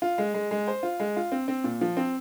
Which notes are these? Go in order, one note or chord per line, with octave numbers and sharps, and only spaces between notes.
F4
G#3
G#3
G#3
C5
F4
G#3
F4
C4
C4
A#2
F3
C4